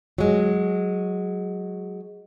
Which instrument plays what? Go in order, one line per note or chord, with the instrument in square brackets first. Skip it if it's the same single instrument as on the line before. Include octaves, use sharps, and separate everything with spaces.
[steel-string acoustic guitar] F#3 G#3